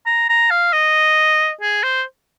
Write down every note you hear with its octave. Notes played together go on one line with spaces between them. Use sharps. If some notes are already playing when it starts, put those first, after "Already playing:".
A#5
A#5
F5
D#5
G#4
C5